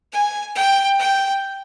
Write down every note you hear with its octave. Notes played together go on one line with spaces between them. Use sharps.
G#5
G5
G5